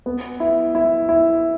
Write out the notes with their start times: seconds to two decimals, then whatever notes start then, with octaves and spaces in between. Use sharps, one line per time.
0.06 B3
0.40 E4
0.75 E4
1.09 E4